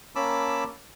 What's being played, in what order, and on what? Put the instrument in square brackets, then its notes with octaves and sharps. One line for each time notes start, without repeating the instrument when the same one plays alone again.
[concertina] A#3 C#4 A5 B5 D6 E6